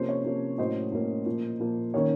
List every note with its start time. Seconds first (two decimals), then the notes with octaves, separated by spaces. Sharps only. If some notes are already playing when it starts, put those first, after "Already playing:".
Already playing: C3 F3 A#3 C#4 C5
0.09 C#5
0.24 C3 F3 A#3 C#4
0.58 A2 F#3 A#3 C#4 C5 D#5
0.92 A2 F#3 A#3 C#4
1.26 A#2 F3 A#3
1.60 A#2 F3 A#3
1.94 D#3 A#3 C#4 C#5